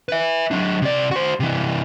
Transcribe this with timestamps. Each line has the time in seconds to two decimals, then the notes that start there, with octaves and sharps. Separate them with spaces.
0.09 B4 E5
0.51 F#3 D4
0.82 C3 D5
1.11 F#4 C5
1.40 C3 E3